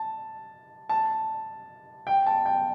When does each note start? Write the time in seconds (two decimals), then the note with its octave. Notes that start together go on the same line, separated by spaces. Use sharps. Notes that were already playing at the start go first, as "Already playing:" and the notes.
Already playing: A5
0.89 A5
2.07 G5
2.26 A5
2.46 G5